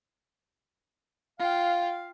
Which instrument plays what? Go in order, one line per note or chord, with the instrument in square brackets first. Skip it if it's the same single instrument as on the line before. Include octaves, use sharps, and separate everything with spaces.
[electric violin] F4 G5 [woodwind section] F5